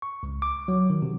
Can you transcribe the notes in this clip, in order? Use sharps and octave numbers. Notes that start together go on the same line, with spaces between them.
C#6
C#2
D6
F#3
D#3
C3